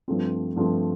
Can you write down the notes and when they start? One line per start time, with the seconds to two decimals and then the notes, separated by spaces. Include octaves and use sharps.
0.08 G2 F3 A3 C4
0.56 G2 F3 A3 C4